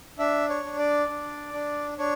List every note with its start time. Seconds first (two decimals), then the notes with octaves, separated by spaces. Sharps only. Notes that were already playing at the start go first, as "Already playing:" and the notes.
0.19 D4 E5
0.49 C#5
0.64 D4
0.79 D5
1.09 D4
1.53 D4
1.98 D4 C#5